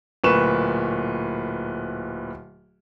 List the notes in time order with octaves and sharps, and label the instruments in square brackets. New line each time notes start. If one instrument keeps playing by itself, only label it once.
[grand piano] D1 A#2 B4 C#6 E7